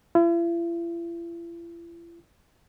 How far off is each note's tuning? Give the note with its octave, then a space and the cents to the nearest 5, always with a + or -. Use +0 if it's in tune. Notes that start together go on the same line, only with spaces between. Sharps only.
E4 +45